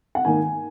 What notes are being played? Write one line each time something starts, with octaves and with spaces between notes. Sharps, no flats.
F#5
G#2 D#3 A#3 D#4 G#5